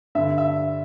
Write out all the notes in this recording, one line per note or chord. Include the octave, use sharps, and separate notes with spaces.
G2 D3 E5
E5